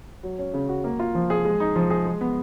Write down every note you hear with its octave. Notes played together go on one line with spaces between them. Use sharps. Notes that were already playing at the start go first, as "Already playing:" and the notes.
F#3
C#4
C#3
F#4
A#3
F4
F3
G#4
G#3
D#4
F3
G#4
G#3
B3